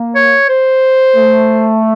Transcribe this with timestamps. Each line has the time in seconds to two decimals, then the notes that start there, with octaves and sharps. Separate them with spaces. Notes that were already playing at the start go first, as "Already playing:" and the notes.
Already playing: A#3
0.15 C#5
0.49 C5
1.16 A3